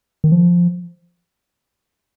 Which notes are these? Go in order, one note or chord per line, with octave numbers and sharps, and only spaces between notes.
D#3
F3